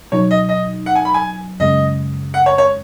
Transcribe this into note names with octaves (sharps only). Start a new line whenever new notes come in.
B2 F#3 D#4 C#5
D#5
D#5
F#5
G#5
B5
G#5
F#2 C#3 G#3 D#5
F#5
C#5
C#5